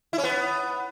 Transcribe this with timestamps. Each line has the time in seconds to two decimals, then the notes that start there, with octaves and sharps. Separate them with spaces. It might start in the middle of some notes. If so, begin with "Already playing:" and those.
0.13 E4
0.18 C#4
0.24 B3